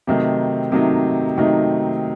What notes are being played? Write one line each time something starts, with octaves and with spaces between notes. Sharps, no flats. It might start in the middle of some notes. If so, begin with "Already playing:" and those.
C3 D#3 F#3 A3 D#4
C3 D#3 F#3 A3 D#4
C3 D#3 F#3 A3 D#4